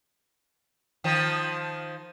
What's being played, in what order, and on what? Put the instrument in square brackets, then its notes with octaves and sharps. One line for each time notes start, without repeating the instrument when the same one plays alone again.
[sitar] D#3 F3